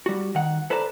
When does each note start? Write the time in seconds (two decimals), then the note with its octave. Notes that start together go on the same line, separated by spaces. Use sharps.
0.06 G3 F#4
0.35 D#3 F#5
0.70 A4 B4 C5 D5 A5 A#5